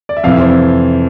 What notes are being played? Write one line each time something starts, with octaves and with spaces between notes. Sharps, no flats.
D5
E5
F2 C3 E3 F5
E5
C5